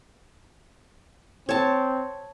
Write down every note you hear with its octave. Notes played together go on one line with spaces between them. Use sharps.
C4 C#5 A5